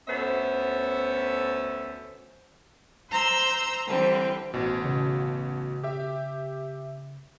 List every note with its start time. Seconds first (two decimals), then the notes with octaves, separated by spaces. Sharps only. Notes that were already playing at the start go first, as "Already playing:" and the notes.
0.08 D2 B3 C#4 A4 C5 E5
3.10 C5 A#5 C6 E6
3.86 D3 E3 G3 C4
4.54 A1 B2
4.85 C#3
5.84 G4 E5